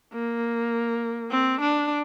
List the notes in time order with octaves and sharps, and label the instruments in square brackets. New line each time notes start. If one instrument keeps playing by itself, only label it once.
[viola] A#3
C4
D4